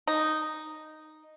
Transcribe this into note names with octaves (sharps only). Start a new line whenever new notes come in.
D#4